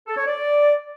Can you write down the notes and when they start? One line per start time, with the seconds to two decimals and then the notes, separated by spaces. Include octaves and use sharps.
0.08 A4
0.17 C#5
0.27 D5